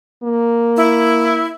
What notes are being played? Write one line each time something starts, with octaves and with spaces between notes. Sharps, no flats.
A#3
E4